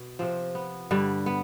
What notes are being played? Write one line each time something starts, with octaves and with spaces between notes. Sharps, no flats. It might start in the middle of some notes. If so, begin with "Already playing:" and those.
Already playing: B2
C3 F3 C4
B3
G2 D3 G3
B3